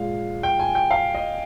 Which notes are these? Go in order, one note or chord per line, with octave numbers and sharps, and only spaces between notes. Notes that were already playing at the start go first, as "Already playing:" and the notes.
Already playing: A#2 G#3 F5
G5
G#5
G5
F5
D#5